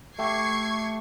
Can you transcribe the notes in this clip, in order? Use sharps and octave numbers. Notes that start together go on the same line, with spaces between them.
A3 G4 C#6 G#6 C7